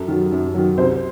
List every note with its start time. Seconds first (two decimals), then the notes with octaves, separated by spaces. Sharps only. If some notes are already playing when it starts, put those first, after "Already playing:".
Already playing: F#2 A4
0.08 D#3 F#3
0.32 F#2
0.54 D#3 F#3
0.78 C2 C5